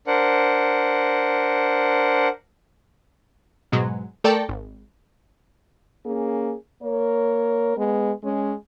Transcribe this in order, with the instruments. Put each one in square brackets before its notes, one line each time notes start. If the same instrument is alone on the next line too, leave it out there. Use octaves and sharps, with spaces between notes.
[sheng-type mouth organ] D4 A#4 C5 F#5
[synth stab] G#2 B2 F#3 G#3
A3 A4 A#4 D5 G5 A5
G#1
[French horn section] A#3 C#4 G#4
A#3 A#4 C#5
G#3 B3
G#3 C#4